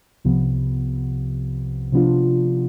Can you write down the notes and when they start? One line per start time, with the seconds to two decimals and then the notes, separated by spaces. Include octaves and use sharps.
0.24 C2 C3 F3 B3
1.92 C3 F3 B3 D4 F4